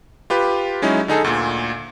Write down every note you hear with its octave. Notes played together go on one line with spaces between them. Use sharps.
F4 G4 B4
F#3 G#3 C#4 D#4 E4
D3 D#4 G#4 A4
D2 A#2